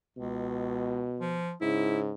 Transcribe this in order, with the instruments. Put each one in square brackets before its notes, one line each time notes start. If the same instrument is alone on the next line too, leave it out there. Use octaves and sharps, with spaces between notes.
[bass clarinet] C#2 [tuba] B2
[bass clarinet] F3
[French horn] G#2 [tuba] C#3 [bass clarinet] E4